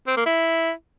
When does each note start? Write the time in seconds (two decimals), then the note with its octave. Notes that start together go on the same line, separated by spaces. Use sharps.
0.07 C4
0.16 A#3
0.25 E4